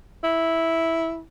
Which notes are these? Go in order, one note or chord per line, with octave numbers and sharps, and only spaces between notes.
E4